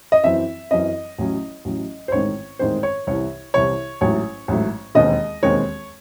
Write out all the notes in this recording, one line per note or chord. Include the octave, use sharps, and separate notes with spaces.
D#5
F#2 E3 C4 E5
F#2 E3 C4 D#5
A1 A2 F#3 C#4
A1 A2 F#3 C#4
C5
A1 G#2 D#3 G#3 C4 C#5
A1 G#2 D#3 G#3 C4 C5
C#5
C2 C3 E3 C#5
C2 C3 E3 C#5
A1 G#2 F#3 A3 C#5
A1 G#2 F#3 A3
E1 D#2 D#3 G#3 C4 D#5
E1 D#2 D#3 G#3 C4 C#5